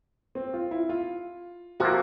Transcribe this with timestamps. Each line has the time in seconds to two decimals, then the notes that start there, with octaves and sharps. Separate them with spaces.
0.35 C4
0.54 F4
0.71 E4
0.89 F4
1.80 C3 F3 A#3 F#4